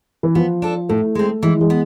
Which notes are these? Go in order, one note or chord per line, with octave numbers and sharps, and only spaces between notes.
E3
F3 B3
D4 A4
A2 A3
G#3 C4
E3 G#3
G#3
B3